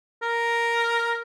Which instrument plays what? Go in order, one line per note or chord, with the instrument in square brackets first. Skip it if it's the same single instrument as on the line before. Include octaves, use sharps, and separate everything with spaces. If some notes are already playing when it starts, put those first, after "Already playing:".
[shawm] A#4